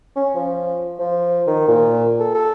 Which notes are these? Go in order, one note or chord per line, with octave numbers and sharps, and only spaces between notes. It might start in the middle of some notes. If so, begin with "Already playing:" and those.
C#4
F3
F3
D#3
A#2
A4
A4